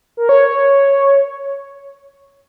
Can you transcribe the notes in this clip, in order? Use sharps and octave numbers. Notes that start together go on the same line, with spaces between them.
A#4
C#5